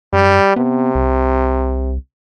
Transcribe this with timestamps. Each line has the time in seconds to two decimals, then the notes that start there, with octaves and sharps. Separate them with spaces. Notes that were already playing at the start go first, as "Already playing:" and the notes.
0.13 F#2 G3
0.56 C3 B3
0.95 C2